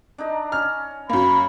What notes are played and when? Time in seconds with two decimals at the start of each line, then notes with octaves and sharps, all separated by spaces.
0.18 D4 D#4 A#5
0.52 C#4 F6
1.10 F#2 A#3 B5